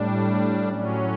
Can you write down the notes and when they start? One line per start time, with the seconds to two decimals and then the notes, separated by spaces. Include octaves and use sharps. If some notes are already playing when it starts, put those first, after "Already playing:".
Already playing: A2 G3 D4
0.69 A2 F#3 C#4